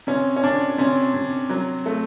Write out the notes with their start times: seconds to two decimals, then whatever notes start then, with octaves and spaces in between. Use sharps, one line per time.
0.07 C3 C#4
0.36 C#4
0.44 C3 D4
0.78 C3 C#4
1.14 C3
1.50 F#3
1.86 A3